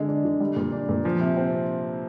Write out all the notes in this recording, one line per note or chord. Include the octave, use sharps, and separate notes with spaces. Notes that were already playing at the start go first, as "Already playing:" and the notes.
Already playing: D3 G#3
D4
D3
G3
A#2
D4
A#2
F3
C3
C4